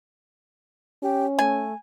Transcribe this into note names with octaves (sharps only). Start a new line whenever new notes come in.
C#4 G4
A3 G#5